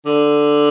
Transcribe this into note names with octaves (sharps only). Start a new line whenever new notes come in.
D3